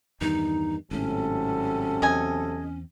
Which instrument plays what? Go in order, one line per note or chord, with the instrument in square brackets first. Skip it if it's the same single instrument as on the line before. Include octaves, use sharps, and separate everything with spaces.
[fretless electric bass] E2 G2 D#3 [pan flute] D#4
[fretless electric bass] G#1 A2 [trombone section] C3 F#3 A4 [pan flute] C#4
[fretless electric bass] E2 C4 [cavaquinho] D#5 G#5